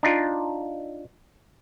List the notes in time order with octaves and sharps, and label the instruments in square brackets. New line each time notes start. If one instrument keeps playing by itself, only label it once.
[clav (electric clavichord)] D4 D#4 F4